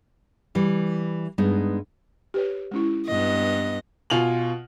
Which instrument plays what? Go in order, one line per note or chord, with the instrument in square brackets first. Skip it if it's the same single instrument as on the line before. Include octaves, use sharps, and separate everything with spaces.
[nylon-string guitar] E3 G3
G2 G#3 B3 D#4
[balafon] G4 B4 C#5
G#3 C#4 E4
[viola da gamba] G2 B3 D#5
[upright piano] B2 F4 G#5 F7 F#7